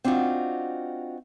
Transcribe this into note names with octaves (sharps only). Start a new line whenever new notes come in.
C4 D4 D#4 F4 F#4